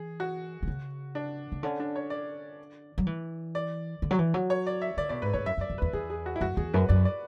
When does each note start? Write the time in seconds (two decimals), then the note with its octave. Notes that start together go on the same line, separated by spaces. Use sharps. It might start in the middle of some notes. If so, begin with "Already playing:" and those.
Already playing: E3 G#4
0.20 F#4
0.63 D3
0.68 C#3
1.15 D4
1.52 C#3
1.63 D3 C#4
1.80 D4
1.96 C#5
2.10 D5
2.98 F#3
3.07 E3
3.55 D5
4.02 D3
4.11 F#3
4.19 E3
4.34 F#3
4.50 C#5
4.67 D5
4.81 E5
4.97 D3 D5
5.09 B2 D5
5.22 G#2 B4
5.33 G#2 C#5
5.46 F#2 E5
5.57 F#2
5.61 D5
5.70 F#2
5.78 E2 B4
5.93 E2 G#4
6.10 G#4
6.26 F#4
6.36 E4
6.41 F#2 F#4
6.57 E2 G#4
6.73 F#2 B4
6.89 F#2 D5
7.05 D5